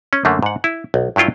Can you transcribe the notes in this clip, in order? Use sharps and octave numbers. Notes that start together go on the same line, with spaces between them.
C#4
F#2 D3 A3 A#3
G#2 F#5
E4
B1
G2 F#3 E4 F4 G5